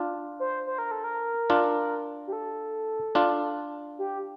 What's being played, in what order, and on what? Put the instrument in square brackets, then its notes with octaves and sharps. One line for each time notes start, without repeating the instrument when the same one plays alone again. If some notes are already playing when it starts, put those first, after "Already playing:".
Already playing: [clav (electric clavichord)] D4 F4
[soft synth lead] C5
C5
A#4
A4
A#4
[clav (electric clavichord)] D4 F4
[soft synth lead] G4
A4
[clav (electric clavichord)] D4 F4
[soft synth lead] G4